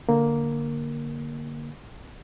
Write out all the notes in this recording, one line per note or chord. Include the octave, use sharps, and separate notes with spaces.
D3 A#3